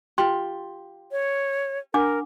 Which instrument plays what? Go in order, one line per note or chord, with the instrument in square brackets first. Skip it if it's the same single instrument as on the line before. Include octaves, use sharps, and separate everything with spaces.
[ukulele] F4 G4 [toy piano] C6
[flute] C#5
[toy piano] D4 F#5 D6 [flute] A#4